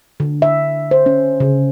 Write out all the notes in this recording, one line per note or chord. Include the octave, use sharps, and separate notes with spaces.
D3
E5
C5
C#4
C#3